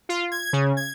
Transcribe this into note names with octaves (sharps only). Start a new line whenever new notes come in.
F4
G#6
C#3
G#6